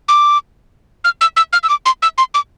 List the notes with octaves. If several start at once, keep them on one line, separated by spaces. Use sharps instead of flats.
D6
F6
E6
E6
F6
E6
D6
C6
E6
C6
D6